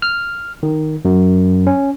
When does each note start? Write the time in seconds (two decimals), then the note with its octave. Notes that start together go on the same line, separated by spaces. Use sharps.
0.02 F6
0.63 D#3
1.05 F#2
1.67 C#4